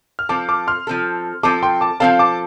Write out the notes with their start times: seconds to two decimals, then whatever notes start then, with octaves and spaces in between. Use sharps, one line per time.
0.19 F6
0.29 F3 C4 A4 A5 D6
0.49 A5 D6
0.68 C6 F6
0.87 F3 C4 A4
1.43 F3 C4 A4 A5 D6
1.63 G5 C6
1.81 A5 D6
2.00 F3 C4 A4 F5 A5
2.19 A5 D6